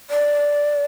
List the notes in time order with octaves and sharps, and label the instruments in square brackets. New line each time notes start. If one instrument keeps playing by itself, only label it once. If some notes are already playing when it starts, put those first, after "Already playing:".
[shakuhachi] D5